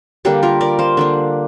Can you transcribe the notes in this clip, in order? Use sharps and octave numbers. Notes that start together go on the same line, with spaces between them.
D3 G3 A#3 D4 G4
F4 A#4
A#4 D5
C5 F5
D3 A#3 D4